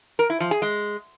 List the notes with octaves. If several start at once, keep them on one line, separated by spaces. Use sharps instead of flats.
A#4
E4
F3
G#4
G#3